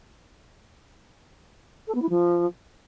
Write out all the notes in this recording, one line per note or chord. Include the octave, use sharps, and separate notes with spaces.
A4
B3
E4
F3